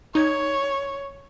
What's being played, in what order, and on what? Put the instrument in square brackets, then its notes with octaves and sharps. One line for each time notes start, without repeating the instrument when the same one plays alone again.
[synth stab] D#4 G#6 [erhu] C#5